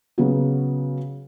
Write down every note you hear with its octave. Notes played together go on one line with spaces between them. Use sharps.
C#3 F#3 B3 F#4